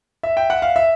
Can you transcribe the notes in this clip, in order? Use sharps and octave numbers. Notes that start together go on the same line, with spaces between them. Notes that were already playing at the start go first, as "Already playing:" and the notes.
E5
G5
F#5
F5
E5